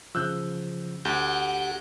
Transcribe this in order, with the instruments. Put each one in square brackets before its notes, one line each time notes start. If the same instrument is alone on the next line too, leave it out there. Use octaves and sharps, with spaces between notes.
[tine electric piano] C#3 F3 [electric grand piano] E6 F#6 G6
[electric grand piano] D2 [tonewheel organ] G4 F#5 [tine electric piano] G6